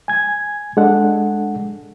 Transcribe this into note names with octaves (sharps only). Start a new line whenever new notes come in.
G#5 G#6
G#3 D4 A4 F#5